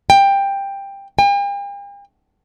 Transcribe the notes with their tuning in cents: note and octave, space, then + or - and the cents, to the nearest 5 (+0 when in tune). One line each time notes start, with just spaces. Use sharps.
G5 +15
G5 +45